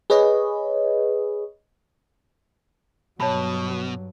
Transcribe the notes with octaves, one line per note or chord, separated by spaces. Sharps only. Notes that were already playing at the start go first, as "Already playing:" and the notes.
G#4 B4 C#5 D#5
G2 B2 F#3 C#5 A5 B5